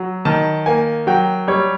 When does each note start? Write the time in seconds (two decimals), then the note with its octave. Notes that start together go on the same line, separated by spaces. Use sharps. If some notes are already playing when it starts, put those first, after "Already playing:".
Already playing: F#3
0.25 D#3 A5
0.66 A#3 G#5
1.07 F#3 G5
1.48 G3 C#5